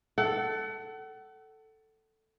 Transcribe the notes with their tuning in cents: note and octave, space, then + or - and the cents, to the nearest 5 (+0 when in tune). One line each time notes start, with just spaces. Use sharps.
A4 +0 F#5 +35